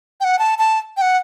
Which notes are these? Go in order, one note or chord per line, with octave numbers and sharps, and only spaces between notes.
G5
F#5
A5
A5
G5
F#5